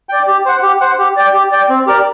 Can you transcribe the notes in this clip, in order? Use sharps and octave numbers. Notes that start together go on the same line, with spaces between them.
D5 G5
G4
C5 F#5
G4
C5 F#5
G4
D5 G5
G4
D5 G5
C4
G4 A#4 D5